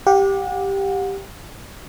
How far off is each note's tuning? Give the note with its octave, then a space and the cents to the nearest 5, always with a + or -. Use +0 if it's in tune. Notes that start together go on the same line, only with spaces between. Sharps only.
G4 +0 F#5 -35